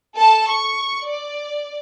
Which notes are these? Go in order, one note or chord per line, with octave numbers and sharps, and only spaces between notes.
A4 A5
C#6
D5